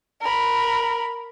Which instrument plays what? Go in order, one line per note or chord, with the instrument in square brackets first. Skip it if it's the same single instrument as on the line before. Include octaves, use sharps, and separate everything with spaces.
[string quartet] A#4 B5